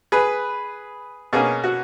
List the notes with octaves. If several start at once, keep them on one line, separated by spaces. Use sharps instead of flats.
G#4 B4
B2 A#3 C#4 G#4
F#4